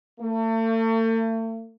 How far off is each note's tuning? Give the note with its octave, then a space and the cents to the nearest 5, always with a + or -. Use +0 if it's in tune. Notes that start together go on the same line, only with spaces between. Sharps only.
A3 +40